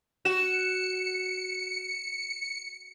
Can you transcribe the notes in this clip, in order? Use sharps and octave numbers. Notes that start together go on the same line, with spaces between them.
F#4 C#7 E7